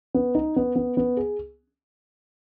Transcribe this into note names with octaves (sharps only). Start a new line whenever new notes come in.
B3
D#4
B3
B3
B3
G#4